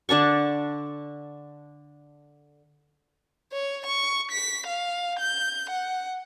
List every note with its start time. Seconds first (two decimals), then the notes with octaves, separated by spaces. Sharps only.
0.09 D3 D4 A5 C#6
3.52 C#5
3.86 C#6
4.31 B6
4.67 F5
5.19 G6
5.69 F#5